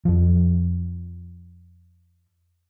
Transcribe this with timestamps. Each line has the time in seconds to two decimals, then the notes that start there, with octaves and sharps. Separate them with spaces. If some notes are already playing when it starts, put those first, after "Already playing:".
0.05 F2 F3